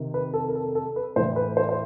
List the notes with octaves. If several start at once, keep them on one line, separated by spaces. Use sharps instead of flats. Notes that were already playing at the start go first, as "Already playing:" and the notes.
Already playing: C3 D#3
B4
A4
A#4
A4
A4
B4
A2 E3 C5
B4
C5
C5